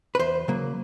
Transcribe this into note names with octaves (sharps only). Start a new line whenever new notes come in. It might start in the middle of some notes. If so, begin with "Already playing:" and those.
B4
E2 C5
C#3 F#3 A#3